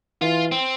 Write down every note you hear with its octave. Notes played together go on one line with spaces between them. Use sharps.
E3 F4
C4